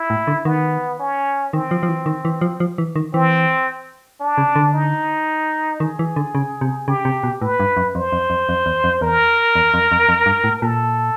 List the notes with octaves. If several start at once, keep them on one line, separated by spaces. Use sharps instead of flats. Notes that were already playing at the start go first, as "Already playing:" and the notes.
Already playing: E4
A2
D3
D#3 B3
C#4
D#3 C4
F3
F3
E3
D#3
E3
F3
F3
E3
D#3
E3 C4
D4
C#3
D3
D#4
D#3 G#4
E3
D3
C#3
C3
C#3 G4
C3
B2
A2 B4
G2
F#2
F2 C5
F2
F2
F2
E2
F2
E2 A#4
E2
F2
F2
F2
G2
A2
A#2 A4